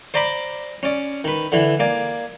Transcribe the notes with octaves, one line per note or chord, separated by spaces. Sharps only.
C5 D5 A#5 B5 D6
C#4 D5
D#3 B4
D3 E3
A#3 D5 G#5